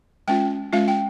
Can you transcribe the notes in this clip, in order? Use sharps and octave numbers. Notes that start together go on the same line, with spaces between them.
G#3 C#4 F4 G5
G#3 C#4 F4 F5
G5